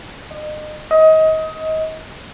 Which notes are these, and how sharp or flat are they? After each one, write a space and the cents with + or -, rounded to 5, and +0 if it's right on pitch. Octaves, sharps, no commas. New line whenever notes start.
D#5 -35
D#5 +25